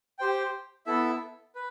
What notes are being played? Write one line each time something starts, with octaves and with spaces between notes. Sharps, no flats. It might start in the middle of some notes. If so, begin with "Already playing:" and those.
G4 C5 G5
B3 E4 A4 E5
B4